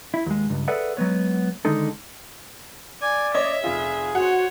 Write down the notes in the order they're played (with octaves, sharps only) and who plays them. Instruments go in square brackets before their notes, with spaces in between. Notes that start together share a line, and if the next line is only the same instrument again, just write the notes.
[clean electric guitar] E4
D#2 G#3
C#2 G2
G#4 A4 B4 D5 E5 F#5
F#3 G#3 B3 C#5
D3 D#3 G#3 D#4 A4
[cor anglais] D5 [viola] G#5
[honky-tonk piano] C#5 D#5 G#6 [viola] E5
[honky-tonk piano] F1 F4 [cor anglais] G#4
[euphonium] F#4 [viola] C5 C#5 [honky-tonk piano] F#5